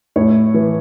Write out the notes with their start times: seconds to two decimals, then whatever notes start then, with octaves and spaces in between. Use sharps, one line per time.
0.16 A2 C#5
0.54 E3